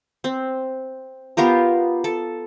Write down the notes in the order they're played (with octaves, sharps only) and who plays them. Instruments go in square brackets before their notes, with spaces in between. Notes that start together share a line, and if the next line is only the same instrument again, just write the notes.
[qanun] C4
B3 F4 G4 A#4
A4